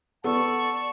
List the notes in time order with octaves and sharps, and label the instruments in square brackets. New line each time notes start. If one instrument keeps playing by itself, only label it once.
[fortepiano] B3 A4 [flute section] D5 F#5 A5 [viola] C#6